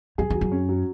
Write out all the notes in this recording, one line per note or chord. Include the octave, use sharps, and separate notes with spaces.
F#2 G#4
E2 F#3
F#2
C#4
F#3